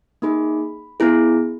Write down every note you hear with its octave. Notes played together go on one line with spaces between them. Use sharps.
A#3 D#4 G#4 B5
B3 E4 G#4